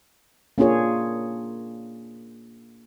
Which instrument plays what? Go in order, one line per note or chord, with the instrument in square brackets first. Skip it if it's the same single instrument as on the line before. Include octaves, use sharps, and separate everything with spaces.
[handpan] A#3 C#4 D4 F4 G#4 C#5